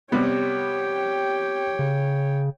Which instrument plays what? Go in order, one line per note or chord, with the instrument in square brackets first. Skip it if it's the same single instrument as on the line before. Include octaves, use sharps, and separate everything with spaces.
[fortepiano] C3 G3 B3 [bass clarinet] G4 [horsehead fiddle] C#5 G5
[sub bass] C#3